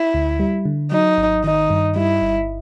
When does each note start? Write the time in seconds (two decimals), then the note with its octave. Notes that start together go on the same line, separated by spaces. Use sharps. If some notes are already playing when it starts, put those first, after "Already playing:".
Already playing: E4
0.14 D2
0.40 G3
0.65 D3
0.92 F#3 D#4
1.18 G#1
1.44 D#3 D#4
1.70 G2
1.96 G3 E4
2.22 G1